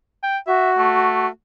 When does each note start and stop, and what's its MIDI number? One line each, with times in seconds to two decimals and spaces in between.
0.23 0.37 79
0.47 1.29 66
0.47 0.70 76
0.77 1.27 57